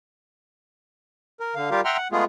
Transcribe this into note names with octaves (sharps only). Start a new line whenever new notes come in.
A#4
D3 F5
G3 F4 G4 A#4 F5
E5 F#5 G5 A#5 C6 F6
F#5
G#3 A3 B3 F4 G#4